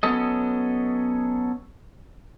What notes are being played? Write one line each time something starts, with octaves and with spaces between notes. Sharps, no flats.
F#3 B3 C#4 A4 D#5